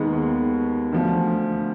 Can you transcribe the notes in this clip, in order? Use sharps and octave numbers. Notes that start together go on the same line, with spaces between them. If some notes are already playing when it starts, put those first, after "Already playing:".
Already playing: D#2 D#3 G#3 B3
D2 D3 F3